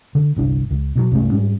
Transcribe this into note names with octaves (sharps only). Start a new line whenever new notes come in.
D3
G1 C2 D4
C#2
B2 E3 F#3
C2 G2 A3 C#4
G#2 G3 C#4